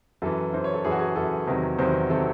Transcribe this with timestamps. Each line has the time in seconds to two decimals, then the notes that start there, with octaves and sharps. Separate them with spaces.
0.22 F#2 E3 A4
0.53 F#2 E3 C5
0.64 C#5
0.74 A4
0.84 F#2 E3 G#4
0.92 F#4
0.99 G#4
1.16 F#2 E3 A4
1.47 E2 C3 D#3 F#3
1.78 E2 C3 D#3 F#3 C5
2.10 C3 D#3 F#3 A4